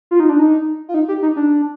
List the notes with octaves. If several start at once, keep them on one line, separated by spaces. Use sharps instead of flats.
F4
D#4
D4
D#4
F4
D#4
G4
D#4
D4